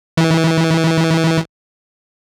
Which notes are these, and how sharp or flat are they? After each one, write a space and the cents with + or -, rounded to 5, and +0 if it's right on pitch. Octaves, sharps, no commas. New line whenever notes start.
E3 -25